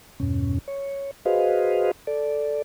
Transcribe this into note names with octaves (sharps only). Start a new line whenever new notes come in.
E2 G2 B2 C#4
C#5
F#4 G#4 B4 C5 D#5 F5
A4 D5